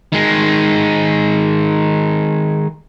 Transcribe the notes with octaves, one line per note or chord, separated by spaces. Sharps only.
D#3 G#3